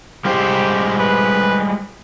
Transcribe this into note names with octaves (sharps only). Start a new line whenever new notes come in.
G3 G#3 G4 C5
B4